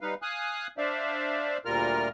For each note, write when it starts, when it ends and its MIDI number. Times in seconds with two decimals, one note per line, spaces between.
0.01 0.14 55
0.01 0.14 63
0.01 0.14 71
0.01 0.14 77
0.22 0.67 77
0.22 0.67 80
0.22 0.67 87
0.22 0.67 90
0.78 1.58 62
0.78 1.58 72
0.78 1.58 74
0.78 1.58 76
0.78 1.58 77
1.65 2.08 38
1.65 2.08 46
1.65 2.08 55
1.65 2.08 65
1.65 2.08 70
1.65 2.08 89